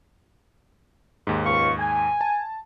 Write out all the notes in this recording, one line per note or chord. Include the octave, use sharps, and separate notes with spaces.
D#2 G#2
C#2 F5 C#6
G#5
A5